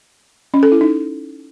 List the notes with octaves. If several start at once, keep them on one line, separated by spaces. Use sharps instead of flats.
C#4
A4
E4
D#4